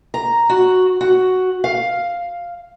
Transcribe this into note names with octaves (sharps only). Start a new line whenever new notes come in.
A#5
F#4
F#4
F5